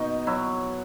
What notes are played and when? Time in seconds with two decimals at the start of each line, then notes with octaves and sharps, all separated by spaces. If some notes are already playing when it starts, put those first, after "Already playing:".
Already playing: B2 D#4
0.27 F#3 E4